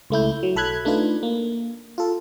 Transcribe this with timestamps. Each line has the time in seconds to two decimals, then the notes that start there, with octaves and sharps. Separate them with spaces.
0.10 C#2 A3 E4 G6
0.43 F#3
0.56 B1 A4 B5 F#6 G#6
0.85 A3 D4 D#4 F4 B4
1.23 A#3
1.98 F4 A4